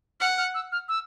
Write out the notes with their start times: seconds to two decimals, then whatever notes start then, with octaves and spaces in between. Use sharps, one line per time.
0.20 F#5 F6
0.38 F6
0.54 E6
0.72 F6
0.89 E6